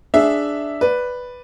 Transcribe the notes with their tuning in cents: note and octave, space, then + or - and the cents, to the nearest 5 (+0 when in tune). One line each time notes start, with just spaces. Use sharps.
D4 +0 G#4 +5 E5 +0
B4 +0 D5 +0